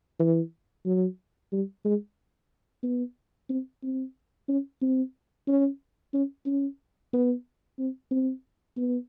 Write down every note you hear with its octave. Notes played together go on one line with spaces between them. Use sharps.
E3
F#3
G3
G#3
B3
C4
C4
C#4
C4
C#4
C#4
C#4
B3
C4
C4
B3